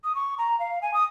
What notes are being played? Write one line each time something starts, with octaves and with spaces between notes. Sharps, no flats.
D#6
C#6
A#5
F5
G#5
D#6